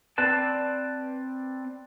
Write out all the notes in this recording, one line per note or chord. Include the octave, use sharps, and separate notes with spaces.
C4 B4 D5 A5